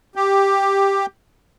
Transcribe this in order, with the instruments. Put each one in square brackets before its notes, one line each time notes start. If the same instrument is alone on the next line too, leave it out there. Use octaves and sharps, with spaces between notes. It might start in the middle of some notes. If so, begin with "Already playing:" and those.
[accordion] G4